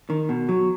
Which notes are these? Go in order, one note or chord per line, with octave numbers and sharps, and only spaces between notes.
D#3
B2
F#3